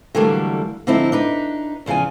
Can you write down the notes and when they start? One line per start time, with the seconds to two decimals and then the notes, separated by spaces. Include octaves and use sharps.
0.15 D3 E3 F#3 G3 A3 A#3
0.87 D3 F3 C4 D#4 E4
1.12 D4 D#4 B4
1.86 E2 C#3 F3 F4 G#5